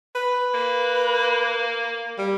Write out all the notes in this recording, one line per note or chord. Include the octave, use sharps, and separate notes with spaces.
B4
A#3
G3